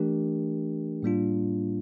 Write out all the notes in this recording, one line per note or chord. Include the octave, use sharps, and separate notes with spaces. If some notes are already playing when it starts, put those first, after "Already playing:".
Already playing: E3 A3 D4 G4 A#4
A2 G3 A#3 D4 F4